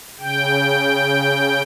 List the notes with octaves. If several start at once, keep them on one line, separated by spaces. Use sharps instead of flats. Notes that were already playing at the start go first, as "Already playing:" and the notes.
C#3 G5